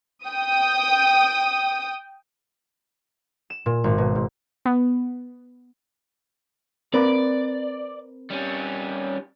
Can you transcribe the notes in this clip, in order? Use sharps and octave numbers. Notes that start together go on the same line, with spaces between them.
G5 D#6
E7
A#2
G#1
B2
G#2
B3
C4 A#4 B4 D5
G3 C#4